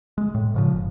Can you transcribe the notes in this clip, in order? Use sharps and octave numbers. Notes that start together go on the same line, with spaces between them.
G#3
A2
G#2 C#3 F3
F#1